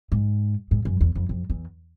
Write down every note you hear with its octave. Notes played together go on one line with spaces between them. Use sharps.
G#2
G#2
F#2
E2
F2
F2
E2